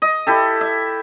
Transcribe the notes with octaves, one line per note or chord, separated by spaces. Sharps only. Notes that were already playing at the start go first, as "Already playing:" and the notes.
D#5
E4 G4 A4
E5